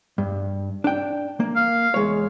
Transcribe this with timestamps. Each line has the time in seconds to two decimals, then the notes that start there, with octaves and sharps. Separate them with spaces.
0.18 G2
0.84 D4 G5
1.40 A#3
1.56 F5
1.94 E2 G#3 C#5